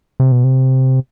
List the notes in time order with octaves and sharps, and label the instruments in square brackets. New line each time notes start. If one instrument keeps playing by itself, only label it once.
[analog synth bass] C3
B2
C3